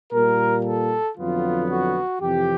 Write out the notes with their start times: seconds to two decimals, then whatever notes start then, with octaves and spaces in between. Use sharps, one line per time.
0.11 A#2 G3 A#3 A#4
0.64 A4
1.16 F2 D3 F#3 B3 F4
1.68 F#4
2.21 F2 C3 E3 G4